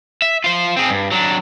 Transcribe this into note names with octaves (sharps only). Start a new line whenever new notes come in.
E5
F4 C5
C4 G#4
G2
F#3 D4